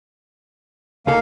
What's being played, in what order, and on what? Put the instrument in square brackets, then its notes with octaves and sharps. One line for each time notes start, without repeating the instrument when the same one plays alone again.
[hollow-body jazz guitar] C#2 D#4 A4 [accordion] A#3 F5